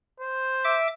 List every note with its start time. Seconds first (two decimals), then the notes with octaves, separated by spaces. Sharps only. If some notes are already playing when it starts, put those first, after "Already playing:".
0.20 C5
0.65 E5 D6